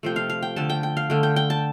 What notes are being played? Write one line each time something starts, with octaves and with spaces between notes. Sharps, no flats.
C3 F3 A3 G5
F5
F5
G5
D3 A3 A5
G5
G5
F5
D3 A3 G5
G5
G5
A5